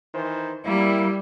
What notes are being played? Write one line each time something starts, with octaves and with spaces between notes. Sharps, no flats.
D#3 E3 C5
G3 A#3 E4